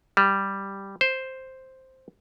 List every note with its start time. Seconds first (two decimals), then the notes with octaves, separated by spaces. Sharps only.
0.17 G3
1.01 C5